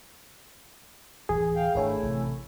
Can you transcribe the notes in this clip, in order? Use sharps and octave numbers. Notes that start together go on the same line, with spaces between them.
D1 E3 G#4
F5 G5
G#1 A3 D4 E4 A#4 C#5 G#5
A1 C3